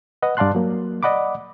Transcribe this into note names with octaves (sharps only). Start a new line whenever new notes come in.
B4 D#5 F#5
G2 D5 F5 A5 C6 F#6
F#3 A#3
D5 D#5 F#5 B5 D6